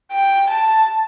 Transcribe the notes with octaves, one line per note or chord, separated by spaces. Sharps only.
G5
A5